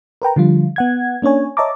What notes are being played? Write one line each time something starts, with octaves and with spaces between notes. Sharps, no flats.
A#4 B4 G5 A#5
D3 F3 G3 F4
B3 F#5 G#6
A#3 C#4 D4 C#5 G#5
C#5 D#5 E5 A5 A#5 D6